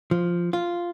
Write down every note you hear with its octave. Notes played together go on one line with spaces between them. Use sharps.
F3
F4